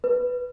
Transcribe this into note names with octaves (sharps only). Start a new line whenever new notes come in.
B4